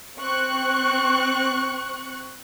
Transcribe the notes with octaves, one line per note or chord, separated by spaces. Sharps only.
C4 C#6 F#6